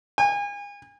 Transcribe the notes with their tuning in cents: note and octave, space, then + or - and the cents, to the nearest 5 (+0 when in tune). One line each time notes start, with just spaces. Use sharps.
G#5 -35